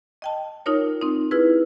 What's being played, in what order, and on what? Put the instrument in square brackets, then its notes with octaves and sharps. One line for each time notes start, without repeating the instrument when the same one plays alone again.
[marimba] D#5 G5 A5
D#4 F4 A#4 C#5
C4 D#4
E4 F4 G#4 B4